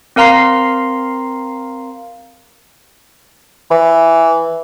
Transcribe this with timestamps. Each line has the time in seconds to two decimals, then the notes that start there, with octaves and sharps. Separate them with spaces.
0.16 C4 A#4 F5 A#5 C6 C7
3.71 E3